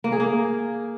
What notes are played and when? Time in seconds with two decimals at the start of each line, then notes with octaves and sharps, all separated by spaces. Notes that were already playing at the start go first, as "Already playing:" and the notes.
0.04 A#3
0.12 G#4
0.20 A#3